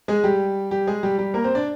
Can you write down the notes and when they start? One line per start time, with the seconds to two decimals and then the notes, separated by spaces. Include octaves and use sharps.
0.08 G#3 G#4
0.24 G3 G4
0.71 G3 G4
0.87 G#3 G#4
1.03 G3 G4
1.18 G3 G4
1.34 A#3 A#4
1.44 C4 C5
1.55 D4 D5